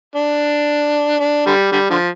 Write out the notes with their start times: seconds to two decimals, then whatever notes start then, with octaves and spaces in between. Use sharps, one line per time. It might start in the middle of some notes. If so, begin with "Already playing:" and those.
0.16 D4
1.20 D4
1.46 D3 G3
1.72 D3 G3
1.90 D3 F3